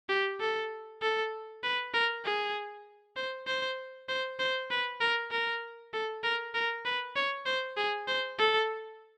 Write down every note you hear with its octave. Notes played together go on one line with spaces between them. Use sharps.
G4
A4
A4
B4
A#4
G#4
C5
C5
C5
C5
B4
A#4
A#4
A4
A#4
A#4
B4
C#5
C5
G#4
C5
A4